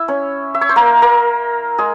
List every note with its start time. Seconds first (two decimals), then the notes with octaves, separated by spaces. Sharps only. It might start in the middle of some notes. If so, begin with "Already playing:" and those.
Already playing: E4 E5
0.08 C#4 C#5
0.55 E5
0.61 C#5
0.69 C5
0.76 A#3 A#4
1.02 A#3 A#4
1.78 G#3 G#4